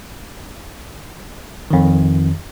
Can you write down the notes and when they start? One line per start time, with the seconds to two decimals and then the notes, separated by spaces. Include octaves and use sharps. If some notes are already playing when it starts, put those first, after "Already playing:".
1.71 F2 D#3